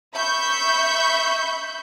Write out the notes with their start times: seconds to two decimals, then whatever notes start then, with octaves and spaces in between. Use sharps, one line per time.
0.15 E5 B5 C#6 G6